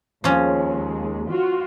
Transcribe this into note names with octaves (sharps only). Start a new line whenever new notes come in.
D#2 F3 G#3 C#4
F4 F#4